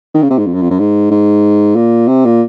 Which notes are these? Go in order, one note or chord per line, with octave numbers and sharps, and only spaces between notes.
D#3
C#3
C3
G#2
F2
F#2
F2
F#2
G#2
G#2
A#2
C3
A#2